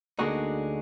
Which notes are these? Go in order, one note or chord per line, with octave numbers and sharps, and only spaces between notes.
D2 D3 G#3 A#3 D4 D#4 F#4